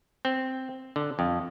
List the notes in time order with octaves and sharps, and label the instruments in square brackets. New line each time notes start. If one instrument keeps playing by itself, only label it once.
[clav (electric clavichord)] C4
D3
F2